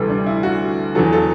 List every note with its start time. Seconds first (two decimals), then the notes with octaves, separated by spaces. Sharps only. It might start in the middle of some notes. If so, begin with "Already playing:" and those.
Already playing: D2 C3 E3 G3 A4 B4
0.09 D4
0.26 E4
0.43 F#4
0.95 E2 D3 F#3 A4
1.12 A4